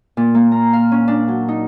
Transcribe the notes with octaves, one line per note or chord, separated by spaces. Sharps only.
A#2
A#3
A#5
F5
C#4
D4
F#3
D#4